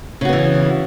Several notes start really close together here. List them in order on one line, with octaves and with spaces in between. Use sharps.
C#3 F#4 B3 E3